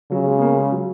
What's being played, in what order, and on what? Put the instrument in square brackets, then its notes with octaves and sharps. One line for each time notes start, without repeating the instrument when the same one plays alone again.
[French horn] C#3 [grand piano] F#3
[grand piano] G#3
B3
A#3
G#3
F#3